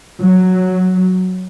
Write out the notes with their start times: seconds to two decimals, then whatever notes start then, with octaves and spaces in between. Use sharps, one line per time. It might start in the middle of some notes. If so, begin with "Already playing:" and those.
0.22 F#3